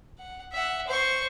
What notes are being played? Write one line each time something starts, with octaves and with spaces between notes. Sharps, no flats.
F#5
E5 F#5
C5 C#6